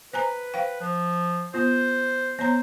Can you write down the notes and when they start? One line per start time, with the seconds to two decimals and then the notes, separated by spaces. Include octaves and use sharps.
0.13 B4 C5 G#5 A#5
0.54 C5 F5 G5
0.81 F3
1.54 B3 F4 C5
2.39 B3 C5 C#5 A#5